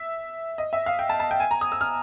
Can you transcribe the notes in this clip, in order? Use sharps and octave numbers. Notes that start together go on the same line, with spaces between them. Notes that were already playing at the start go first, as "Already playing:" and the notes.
Already playing: E5
D#5
E5
F5
G5
A5
A5
G5
G#5
A#5
D#6
E6
F6